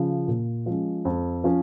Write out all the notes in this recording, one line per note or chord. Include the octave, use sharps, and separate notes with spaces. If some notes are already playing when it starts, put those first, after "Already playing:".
Already playing: C#3 F3
A#2
F3 G#3 C#4
F2
F3 C#4